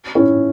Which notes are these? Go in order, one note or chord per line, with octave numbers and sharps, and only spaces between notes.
C#4 E4